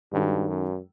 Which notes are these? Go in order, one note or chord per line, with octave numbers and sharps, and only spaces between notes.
G2 D#3 G#3 C#4 F#4 A4
F#2